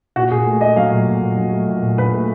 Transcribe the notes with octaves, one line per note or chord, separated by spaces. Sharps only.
A#2 F#4
A#2 G#4
A3
A3 D#5
F#3 F5
A#2
A#2
A#2
F#3
A3
A#2
A#2
A#2 B4
A3